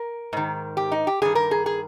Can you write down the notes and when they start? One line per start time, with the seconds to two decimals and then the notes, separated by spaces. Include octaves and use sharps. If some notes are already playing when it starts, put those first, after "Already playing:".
Already playing: A#4
0.33 G#2 D#3
0.77 G4
0.92 D#4
1.07 G4
1.22 G2 D#3 G#4
1.35 A#4
1.51 G#4
1.66 G#4